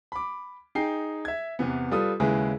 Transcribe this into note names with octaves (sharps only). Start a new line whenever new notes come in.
B5 D6
D#4 G#4 G5 C7
E5 G#6
E2 C3 E3 B3
G3 F4 A4 B4 D#6
D#2 C#3 G#3 E4 G#4 B4